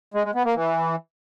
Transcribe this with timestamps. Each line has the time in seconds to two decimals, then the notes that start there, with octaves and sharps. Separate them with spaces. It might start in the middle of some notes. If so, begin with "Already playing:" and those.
0.14 G#3
0.25 G#3
0.35 B3
0.45 A#3
0.56 E3